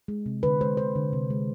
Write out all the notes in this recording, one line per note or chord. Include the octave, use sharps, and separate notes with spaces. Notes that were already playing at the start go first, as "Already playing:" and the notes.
G#3
C3
D3 B4
G#3 C5
D3 C5
D3
C3
G#3